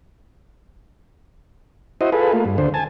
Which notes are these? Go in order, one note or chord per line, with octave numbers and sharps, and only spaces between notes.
E4 F#4 C5 D#5
F4 G#4 A4 B4
A3 A#3 F4
G2
D2 D3 C5
G#5 A5